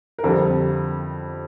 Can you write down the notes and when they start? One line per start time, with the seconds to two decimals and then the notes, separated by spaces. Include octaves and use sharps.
0.19 A#4
0.23 F2 D3 G3 A4